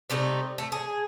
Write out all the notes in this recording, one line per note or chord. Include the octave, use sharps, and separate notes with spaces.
C3 G3 A3 D#4
A3
G#4